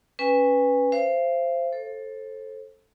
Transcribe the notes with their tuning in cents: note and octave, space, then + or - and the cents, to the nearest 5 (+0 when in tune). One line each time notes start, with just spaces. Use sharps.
C#4 +0 B4 +0 G#5 -30
C5 +0 F5 -40
A4 +0 C5 +30